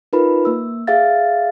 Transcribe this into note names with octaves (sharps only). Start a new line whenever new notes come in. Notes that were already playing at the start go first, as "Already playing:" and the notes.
D#4 F4 A#4 B4 B5
A#3 E6
G#4 E5 F5 A6